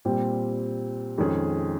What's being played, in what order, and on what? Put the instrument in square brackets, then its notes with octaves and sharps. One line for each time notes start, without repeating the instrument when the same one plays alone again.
[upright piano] A#2 G3 C4
F2 D#3 G#3 C#4 G#4